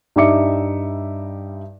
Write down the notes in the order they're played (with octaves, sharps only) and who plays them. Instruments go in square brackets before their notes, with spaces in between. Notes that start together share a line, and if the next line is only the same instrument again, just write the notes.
[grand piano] G2 G3 D#4 E5 D6 C#7